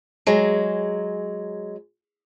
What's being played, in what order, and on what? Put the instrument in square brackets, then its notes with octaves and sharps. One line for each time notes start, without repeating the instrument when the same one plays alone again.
[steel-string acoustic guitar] F#3 G#3